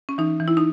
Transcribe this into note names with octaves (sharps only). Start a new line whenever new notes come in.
C#4
E3 D#4
E3
E4
D#4